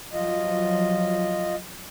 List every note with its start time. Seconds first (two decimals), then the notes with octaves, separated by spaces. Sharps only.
0.13 F3 F#3 F4 D#5